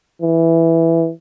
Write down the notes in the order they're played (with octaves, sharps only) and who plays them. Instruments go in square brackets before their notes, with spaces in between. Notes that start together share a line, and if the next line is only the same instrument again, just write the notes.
[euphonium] E3